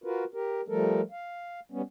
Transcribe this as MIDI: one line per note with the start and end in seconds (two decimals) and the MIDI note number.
0.04 0.24 65
0.04 0.24 66
0.04 0.24 70
0.04 0.24 71
0.34 0.61 67
0.34 0.61 70
0.68 1.01 53
0.68 1.01 55
0.68 1.01 57
0.68 1.01 69
0.68 1.01 70
1.11 1.60 77
1.71 1.82 55
1.71 1.82 59
1.71 1.82 61